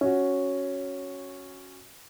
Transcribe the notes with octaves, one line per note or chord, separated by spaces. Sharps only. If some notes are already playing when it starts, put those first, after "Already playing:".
C#4 F#4